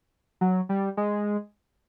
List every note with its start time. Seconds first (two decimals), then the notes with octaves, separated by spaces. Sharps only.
0.41 F#3
0.69 G3
0.97 G#3